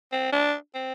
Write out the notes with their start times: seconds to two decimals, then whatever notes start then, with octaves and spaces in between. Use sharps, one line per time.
0.12 C4
0.33 D4
0.75 C4